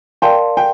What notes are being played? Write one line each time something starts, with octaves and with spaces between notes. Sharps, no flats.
A#4 D5 F5 G5 A5 C6
G5